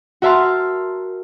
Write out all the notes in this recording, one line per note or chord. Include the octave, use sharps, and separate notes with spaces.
F#4 A#4 E5 A5 C6 F6